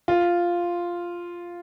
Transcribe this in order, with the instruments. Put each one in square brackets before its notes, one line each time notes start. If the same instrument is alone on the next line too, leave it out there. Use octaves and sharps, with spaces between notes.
[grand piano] F4